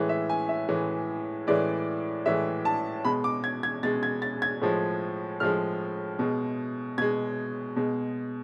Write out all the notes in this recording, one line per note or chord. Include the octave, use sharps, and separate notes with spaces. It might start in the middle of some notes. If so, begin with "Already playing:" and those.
Already playing: A2 E3 G#3
E5
G#5
E5
A2 E3 G#3
A2 E3 G#3 D5
A2 E3 G#3 E5
A5
B2 G#3 B5
D6
G#6
G#6
B2 G#3 A6
G#6
A6
G#6
A2 F3 G#3
A2 F3 G#3 F6
B2 G#3
B2 G#3 G#6
B2 G#3